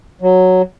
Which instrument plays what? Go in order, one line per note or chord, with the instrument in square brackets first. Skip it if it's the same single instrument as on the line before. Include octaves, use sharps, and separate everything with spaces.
[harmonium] F#3